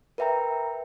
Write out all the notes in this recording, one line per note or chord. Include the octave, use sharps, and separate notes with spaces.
A#4 B4 E5 G5 A#5